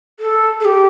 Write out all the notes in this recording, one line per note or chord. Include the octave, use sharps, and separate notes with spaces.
A4
A4
G4